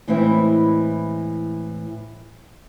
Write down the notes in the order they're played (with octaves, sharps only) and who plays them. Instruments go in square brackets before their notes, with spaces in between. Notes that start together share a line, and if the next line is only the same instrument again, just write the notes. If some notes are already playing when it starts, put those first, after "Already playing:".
[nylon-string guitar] A2 E3 G#3 C4 E4